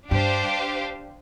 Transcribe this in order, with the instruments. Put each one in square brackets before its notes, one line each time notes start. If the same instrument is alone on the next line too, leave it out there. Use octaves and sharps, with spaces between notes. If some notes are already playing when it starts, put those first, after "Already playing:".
[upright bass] G2 [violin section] D4 G4 C5 F5